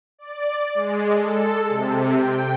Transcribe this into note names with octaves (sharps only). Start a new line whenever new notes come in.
D5
G#3
A4
C3
G5